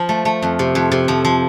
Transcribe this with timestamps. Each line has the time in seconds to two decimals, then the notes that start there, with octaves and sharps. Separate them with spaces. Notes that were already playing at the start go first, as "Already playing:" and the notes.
Already playing: F3
0.09 A3
0.25 A3
0.42 F2
0.59 C3
0.75 F2
0.92 C3
1.08 F3
1.25 F3